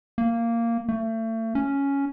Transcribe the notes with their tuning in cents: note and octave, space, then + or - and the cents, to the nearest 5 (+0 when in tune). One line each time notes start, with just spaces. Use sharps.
A#3 -10
A3 +35
C#4 +5